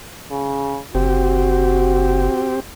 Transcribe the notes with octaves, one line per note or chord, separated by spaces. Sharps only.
C#3
F#1 C4 F#4 G4